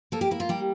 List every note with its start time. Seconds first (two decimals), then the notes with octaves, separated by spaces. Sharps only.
0.12 A#3 A4
0.21 G4
0.31 A#3 E4
0.40 F4
0.49 G3 G4